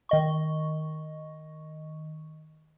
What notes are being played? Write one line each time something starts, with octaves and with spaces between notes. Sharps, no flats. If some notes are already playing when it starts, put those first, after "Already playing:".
D#3 D#5 C#6